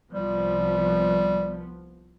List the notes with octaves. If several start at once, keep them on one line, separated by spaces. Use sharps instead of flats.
C2 F3 G3 B3